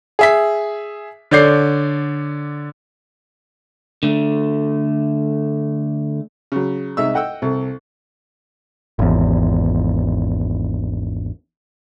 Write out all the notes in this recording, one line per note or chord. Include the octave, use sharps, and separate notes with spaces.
G#4 E5 B6
D3 C#5 D5 G6 C7
D3 A3
C#3 F#3
C2 G#3 D#4 E5 E6
D#5 F#5 G5 E6
C2 A4
G#1 E2